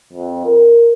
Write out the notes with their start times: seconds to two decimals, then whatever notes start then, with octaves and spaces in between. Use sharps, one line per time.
0.13 F2
0.45 A#4